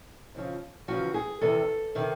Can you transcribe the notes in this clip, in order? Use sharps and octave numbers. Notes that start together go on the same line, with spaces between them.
F2 C#3 F3
E2 C#3 F3 F#4
G#4
E2 C3 D#3 A4
C3 D#3